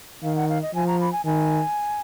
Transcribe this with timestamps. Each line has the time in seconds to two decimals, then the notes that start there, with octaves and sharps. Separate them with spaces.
0.23 D#3 F5
0.36 F#5
0.49 F5
0.62 D#5
0.74 F3 G#5
0.87 A#5
1.01 B5
1.13 G#5
1.25 D#3 G#5